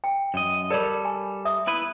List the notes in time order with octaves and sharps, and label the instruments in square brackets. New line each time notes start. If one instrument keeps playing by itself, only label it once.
[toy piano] G5
[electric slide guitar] F#2 D#5
[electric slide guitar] G3 A4 [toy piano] A#4 C#5 D5
[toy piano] G#5
E5 D#6
[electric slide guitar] B3 E4 B4